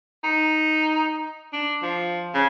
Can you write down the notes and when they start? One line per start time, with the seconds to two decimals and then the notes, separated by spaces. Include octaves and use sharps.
0.24 D#4
1.53 D4
1.82 F3
2.34 C#3